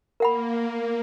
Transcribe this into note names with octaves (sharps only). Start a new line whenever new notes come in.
A#3 A#4 F#5 B5